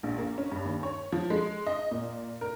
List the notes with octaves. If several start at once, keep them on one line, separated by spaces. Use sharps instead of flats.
A#1
A#3
C#4
G2
D#2
C#5
F3
G#3
D#5
A#2
A#4